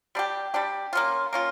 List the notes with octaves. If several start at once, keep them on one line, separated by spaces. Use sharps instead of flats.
G3 D4 G4
G3 D4 G4
A#3 C#4 F4
A#3 C#4 F4